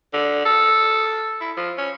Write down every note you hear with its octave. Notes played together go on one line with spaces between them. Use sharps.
D3
A4
E4
F3
C#4